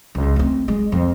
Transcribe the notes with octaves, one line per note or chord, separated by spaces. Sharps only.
C#2
A3 C4
G#3
F2